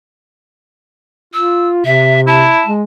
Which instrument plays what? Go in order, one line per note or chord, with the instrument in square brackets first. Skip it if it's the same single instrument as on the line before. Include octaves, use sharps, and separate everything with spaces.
[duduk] F4 [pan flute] E6
[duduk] C3 [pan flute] E5
[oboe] E4 [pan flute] A5
[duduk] G#3